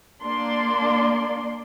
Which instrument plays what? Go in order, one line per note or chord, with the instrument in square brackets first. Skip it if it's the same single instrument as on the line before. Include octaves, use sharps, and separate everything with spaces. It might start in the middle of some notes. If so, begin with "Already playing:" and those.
[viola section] A#3 D4 D5 C6